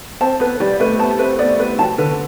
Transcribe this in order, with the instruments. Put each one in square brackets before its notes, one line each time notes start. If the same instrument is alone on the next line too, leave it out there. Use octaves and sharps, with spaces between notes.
[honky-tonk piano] C4 [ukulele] A5
[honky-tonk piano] B3 [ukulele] B4
[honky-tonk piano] G3 [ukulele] D5
[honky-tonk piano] A3 [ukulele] B4
[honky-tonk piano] B3 [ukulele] A5
[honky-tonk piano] C4 [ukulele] B4
[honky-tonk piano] B3 [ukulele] D5
[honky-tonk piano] B3 [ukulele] B4
[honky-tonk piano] F#3 [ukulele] A5
[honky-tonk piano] D3 [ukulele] B4